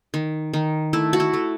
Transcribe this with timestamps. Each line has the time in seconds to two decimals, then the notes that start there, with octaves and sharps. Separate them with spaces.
0.14 D#3
0.53 D#3
0.93 A3 E4
1.13 F#4
1.20 E4
1.33 A3